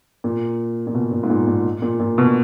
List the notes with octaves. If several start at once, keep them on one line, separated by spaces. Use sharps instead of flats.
A#2
A#2
B2
A#2
G#2
A#2
A#2
A#2
A#2
B2